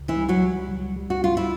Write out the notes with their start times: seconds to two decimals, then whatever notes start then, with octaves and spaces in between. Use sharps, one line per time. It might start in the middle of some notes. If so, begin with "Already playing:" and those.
Already playing: C#2
0.08 E3 E4
0.16 G3
0.29 F#3 F#4
0.42 G3
0.69 C#2
0.96 G3
1.10 F#4
1.23 C#2 F4
1.37 E4